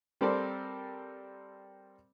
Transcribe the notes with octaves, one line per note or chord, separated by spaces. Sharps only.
G3 C4 A4 A#4 C5 D5